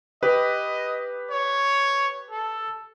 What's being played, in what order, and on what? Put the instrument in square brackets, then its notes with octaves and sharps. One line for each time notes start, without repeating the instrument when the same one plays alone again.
[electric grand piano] G4 B4 [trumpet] D#5
[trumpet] C#5
A4